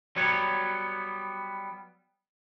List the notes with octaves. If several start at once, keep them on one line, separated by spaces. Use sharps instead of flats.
F#3 G3 B3 C#5